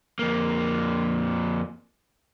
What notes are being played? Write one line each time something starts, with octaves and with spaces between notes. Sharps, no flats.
F2 A#3